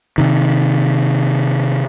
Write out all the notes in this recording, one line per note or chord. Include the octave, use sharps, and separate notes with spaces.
C3 D#3